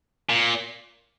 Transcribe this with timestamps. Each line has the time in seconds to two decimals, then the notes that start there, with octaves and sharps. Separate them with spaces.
0.29 A#2